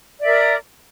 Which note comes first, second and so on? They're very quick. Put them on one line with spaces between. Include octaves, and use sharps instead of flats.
D5 E5 A#4